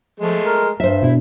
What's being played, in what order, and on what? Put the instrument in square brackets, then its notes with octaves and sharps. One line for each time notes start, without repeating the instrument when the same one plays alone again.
[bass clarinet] F3 [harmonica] G#3 A3
[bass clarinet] A#4
[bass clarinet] G2 [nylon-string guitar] C5 E5
[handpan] B2 D4 [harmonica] E4